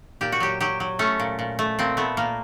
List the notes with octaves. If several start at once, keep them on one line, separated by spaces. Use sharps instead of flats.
A#2 G4
F#4
F#3 G4
F#3 G4
F#3
A3 C#4
A#2
A#2
A3
A#2 C4
A3 B3
A#2 A#3